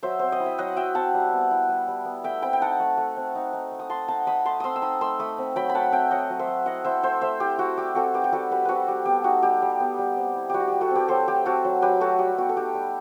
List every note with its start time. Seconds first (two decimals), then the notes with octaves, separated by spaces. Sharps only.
0.03 F#3 C5 E5
0.19 C4 C5
0.32 D#5
0.40 E4
0.46 E5
0.58 F#3 D#5 F#5
0.76 F#3 E5 G5
0.95 C4 F#5 A5
1.14 G3
1.33 B3
1.51 E4
1.69 G3
1.88 G3
2.05 B3
2.24 A3 E5 G5
2.42 C4 G5 B5
2.53 G5
2.61 D#4 F#5 A5
2.80 A3
2.97 A3
3.16 C4
3.35 D#4
3.53 D#4
3.71 A3
3.79 D#6
3.89 A3 A5 C6
4.08 D#4 F#5 A5
4.27 D#4 B5 D#6
4.45 A3 A5 C6
4.60 C4 C6 D#6 E6
4.76 E6
4.82 D#4 B5 D#6
5.01 A3 C6 E6
5.19 A3 B5 D#6
5.38 C4
5.56 F#3 G5 B5
5.69 B5
5.75 A3 F#5 A5
5.92 C4 E5 G5
6.11 F#3 D#5 F#5
6.30 F#3
6.39 C5 E5
6.48 A3
6.66 E4 D#5 F#5
6.84 E4 C5 E5
7.03 A3 C5 E5
7.21 A3 C5 E5
7.40 E4 G4
7.58 E4 F#4
7.77 G3 G4
7.95 C4 F#4 A4
8.14 D#4 G4 B4
8.24 G4
8.32 G3 F#4 A4
8.51 G3 G4 B4
8.65 C4 F#4 A4 B4
8.88 G3 G4
9.05 B3 G4
9.24 D#4 F#4
9.42 G3 G4
9.62 G3
9.80 B3
9.99 G3
10.16 C4
10.36 E4
10.50 G3 F#4 G4
10.60 F#4
10.68 G3 G4
10.81 F#4 A4
10.90 C4
10.95 G4 B4
11.08 F#3 A4 C5
11.28 A3 G4
11.45 C4 F#4 A4
11.65 F#3
11.82 F#3 G4 B4
12.00 A3 F#4 A4
12.19 G3 G4
12.37 B3 F#4
12.49 A4
12.56 D#4 G4
12.74 G3